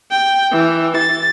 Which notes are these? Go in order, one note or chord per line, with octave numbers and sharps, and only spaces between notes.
G5
E3
A6